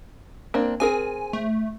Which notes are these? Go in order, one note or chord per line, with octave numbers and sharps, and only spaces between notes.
A#3 C4 D4
C4 G#4 A#4 G#5
A3